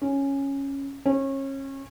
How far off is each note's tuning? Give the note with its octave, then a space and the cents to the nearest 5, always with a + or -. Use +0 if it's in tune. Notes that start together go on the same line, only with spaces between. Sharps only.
C#4 -5
C#4 -30